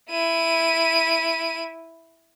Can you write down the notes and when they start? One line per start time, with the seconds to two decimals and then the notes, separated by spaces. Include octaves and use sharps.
0.11 E4 D#7